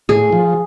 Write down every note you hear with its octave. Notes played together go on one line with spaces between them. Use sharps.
A2 G#4
F3